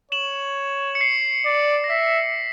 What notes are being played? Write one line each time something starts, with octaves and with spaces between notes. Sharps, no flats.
C#5 E7 F#7
C#7
C7
D5
A#6
E5 B6